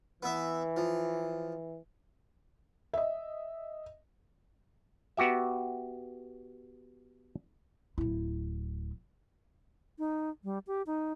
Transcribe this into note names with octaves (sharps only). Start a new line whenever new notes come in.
E3 B3 E5
F3
D#5 E5
B3 F#4 G4 E5
D1 E4
D#4
G3
G4
D#4